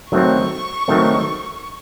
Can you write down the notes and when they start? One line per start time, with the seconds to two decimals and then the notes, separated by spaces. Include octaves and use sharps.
0.11 D#3 F#3 A3 C4 C#6
0.88 D#3 F#3 A3 C4